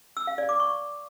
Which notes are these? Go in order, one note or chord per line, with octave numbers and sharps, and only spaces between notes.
E6
F5
D5
D6
C#6